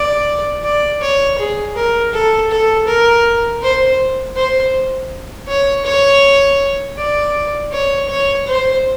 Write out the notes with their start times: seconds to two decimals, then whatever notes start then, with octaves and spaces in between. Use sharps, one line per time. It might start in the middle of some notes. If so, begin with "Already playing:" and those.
Already playing: D5
0.64 D5
1.02 C#5
1.39 G#4
1.76 A#4
2.13 A4
2.51 A4
2.87 A#4
3.63 C5
4.36 C5
5.48 C#5
5.85 C#5
6.98 D5
7.73 C#5
8.10 C#5
8.47 C5